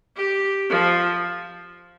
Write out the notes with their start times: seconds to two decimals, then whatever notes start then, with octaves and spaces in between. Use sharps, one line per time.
0.16 G4
0.70 F3